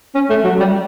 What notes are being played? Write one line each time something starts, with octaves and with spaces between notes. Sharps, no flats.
C#4
A3
F#3
G3